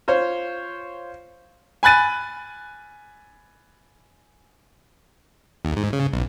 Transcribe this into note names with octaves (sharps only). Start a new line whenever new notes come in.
F4 C5 C#5
G#5 B5 F#6 A6 D#7
D#2
G#2
C#3
B1